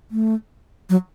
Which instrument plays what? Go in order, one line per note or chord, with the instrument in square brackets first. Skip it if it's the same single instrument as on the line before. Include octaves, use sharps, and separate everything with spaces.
[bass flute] A3
F#3